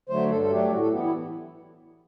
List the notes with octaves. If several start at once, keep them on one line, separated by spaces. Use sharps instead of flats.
D3 F#3 A3 C5
G2 A4
A4
F#3 A3 D4 G4
A2 F#4
A4
E3 B3 G4
E4